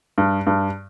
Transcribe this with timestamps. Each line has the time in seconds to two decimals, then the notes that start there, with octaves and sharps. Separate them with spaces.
0.18 G2
0.47 G2